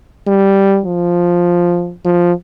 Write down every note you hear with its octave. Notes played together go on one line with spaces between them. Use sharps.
G3
F3
F3